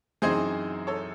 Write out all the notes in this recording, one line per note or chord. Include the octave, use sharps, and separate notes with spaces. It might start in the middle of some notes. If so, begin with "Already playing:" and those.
F#2 E3 C4 D#4 G#4 C5
A4 C#5